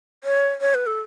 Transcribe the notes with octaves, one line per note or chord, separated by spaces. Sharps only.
C#5
C#5
B4
A4